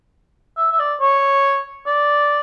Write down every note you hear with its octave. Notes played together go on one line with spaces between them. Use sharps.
E5
E5
D5
C#5
D5